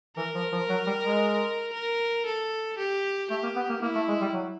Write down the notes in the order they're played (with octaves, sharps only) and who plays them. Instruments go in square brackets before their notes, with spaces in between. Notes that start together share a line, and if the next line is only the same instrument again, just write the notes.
[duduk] E3 [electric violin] A#4
[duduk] F3
F3
F#3
G3
G#3
[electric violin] A#4
A4
G4
[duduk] A3 [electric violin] G4
[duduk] A#3
B3
A#3
[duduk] A#3 [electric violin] E4
[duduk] A3
G#3
G3
F#3